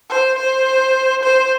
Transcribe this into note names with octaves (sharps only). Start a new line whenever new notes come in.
C5
C5
C5